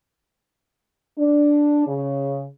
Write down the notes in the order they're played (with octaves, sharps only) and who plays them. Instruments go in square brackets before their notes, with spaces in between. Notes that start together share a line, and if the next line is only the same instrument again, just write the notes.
[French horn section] D4
C#3